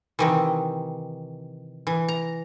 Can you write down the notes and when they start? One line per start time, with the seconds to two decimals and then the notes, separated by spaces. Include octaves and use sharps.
0.19 C3 D#3 E3
1.87 E3
2.08 A#5